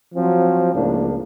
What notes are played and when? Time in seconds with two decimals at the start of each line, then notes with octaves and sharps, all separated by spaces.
0.15 F3 F#3 C4
0.73 C#2 A2 F3 A#3 D4